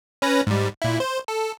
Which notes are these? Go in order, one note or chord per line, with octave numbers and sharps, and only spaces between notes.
C#4 B4 A#6
G#2 G3
A#2 E4
C5
A4